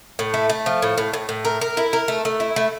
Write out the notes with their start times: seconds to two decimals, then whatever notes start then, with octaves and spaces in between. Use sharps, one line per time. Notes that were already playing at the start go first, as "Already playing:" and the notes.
0.19 A2
0.34 A3
0.50 A3
0.66 F3
0.82 A2
0.98 A2
1.13 A2
1.29 A2
1.45 A#4
1.61 A#4
1.77 E4
1.93 A#4
2.08 A3
2.25 A3
2.40 E4
2.56 A3